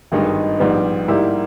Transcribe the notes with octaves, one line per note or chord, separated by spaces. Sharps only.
G#1 G2 D#3 G#3 D#4
A#1 G#2 G3 B3 G4
G#2 G3 A#3 E4 G4